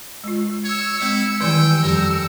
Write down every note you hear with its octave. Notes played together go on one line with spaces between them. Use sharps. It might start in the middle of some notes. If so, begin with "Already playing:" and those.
G#3 F4
C#5 E6 C#7
G#3 C4 E4
D#3 E3 G3 E4 D5 G5 G#5
F2 G3 A#4